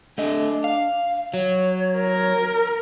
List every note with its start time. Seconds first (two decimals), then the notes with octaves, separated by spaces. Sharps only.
0.18 A3 D4 D#5
0.64 F5
1.34 F#3 C#5
1.97 A#4